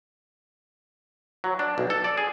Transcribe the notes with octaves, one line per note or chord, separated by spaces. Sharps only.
F#3
D4
B1
A4
D5
G#4